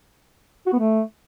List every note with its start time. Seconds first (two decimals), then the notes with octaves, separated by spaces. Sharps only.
0.66 F#4
0.72 B3
0.79 A3